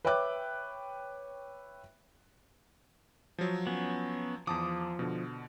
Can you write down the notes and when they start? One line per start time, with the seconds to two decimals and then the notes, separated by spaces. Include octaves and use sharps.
0.05 B4 C#5 E5 G5 D6 F#6
3.38 F3 F#3
3.67 B3 C#4
4.47 E2 F3 A5 D6 D#6
4.99 B2 D3